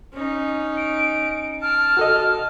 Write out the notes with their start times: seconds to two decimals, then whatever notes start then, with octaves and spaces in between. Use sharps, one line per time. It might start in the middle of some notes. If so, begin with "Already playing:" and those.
0.13 C#4 D#4
0.77 D7
1.62 A5 F6
1.97 F#4 A4 D#5